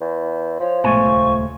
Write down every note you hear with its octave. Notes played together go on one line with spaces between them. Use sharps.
E2
F3 C#5
A#1 G#2 B2 A3 G#5 C#6
D#1 C#2